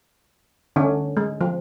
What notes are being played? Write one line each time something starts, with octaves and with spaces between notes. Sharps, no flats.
D3 C#4
G#3
F3